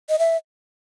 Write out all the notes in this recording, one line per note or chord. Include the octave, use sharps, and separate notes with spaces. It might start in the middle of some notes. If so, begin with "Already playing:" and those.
D#5
E5